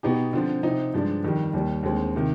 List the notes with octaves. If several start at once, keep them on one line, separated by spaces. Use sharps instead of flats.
B2 B3 D#4 G4
D3 F3 C4
C3 F3 C4 D#4
G2 F3 G#3 D4
F2 D#3 G3
D#2 D#3 G3
D#2 D3 G#3 C4
C3 D#3